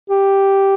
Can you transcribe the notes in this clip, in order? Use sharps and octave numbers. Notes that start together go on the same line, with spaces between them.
G4